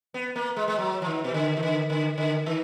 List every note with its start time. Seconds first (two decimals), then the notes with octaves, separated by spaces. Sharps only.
0.14 B3
0.36 A#3
0.57 G#3
0.68 G#3
0.78 F#3
1.02 F3
1.06 D#3
1.24 B2
1.34 D3
1.57 D#3
1.63 D3
1.90 D3
2.18 D3
2.46 D#3